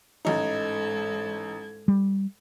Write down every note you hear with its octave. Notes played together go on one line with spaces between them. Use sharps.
A1 G#2 D#4 A4 G#6
G3